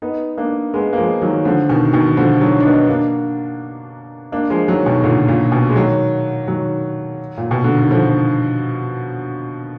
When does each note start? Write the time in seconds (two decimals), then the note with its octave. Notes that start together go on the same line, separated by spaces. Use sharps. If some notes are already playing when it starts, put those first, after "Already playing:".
0.02 B3 D#4
0.38 A#3 D4
0.74 G#3 B3
0.93 A#3
0.98 F3 G#3
1.21 D#3 F#3
1.45 D3 F3
1.69 B2 D#3
1.93 B2 D#3
2.07 D#3
2.17 D3 F3
2.41 D#3 F#3
2.60 D4
2.65 B3 D#4
2.89 A#3 D4
4.32 A#3 D4
4.50 F3 G#3
4.68 D#3 F#3
4.86 B2 D#3
5.04 A#2 D3
5.28 A#2
5.52 B2
5.70 G#3
5.76 D#3 F#3
6.48 D#3 F#3
7.37 A#2
7.51 B2
7.64 D3
7.78 D#3
7.91 D3 F3